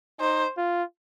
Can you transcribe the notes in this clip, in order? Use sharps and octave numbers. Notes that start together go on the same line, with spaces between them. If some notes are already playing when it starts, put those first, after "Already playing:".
D#4 C5
F4